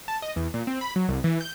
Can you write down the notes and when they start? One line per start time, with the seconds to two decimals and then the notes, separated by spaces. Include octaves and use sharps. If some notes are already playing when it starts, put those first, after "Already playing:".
0.08 A5
0.22 D#5
0.36 E2
0.54 A#2
0.67 C4
0.81 B5
0.96 F#3
1.09 C2
1.24 E3
1.41 G6